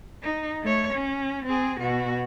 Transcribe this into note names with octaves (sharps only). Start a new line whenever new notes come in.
D#4
A3 C#5
C#4
C4 G#4
B2 F#4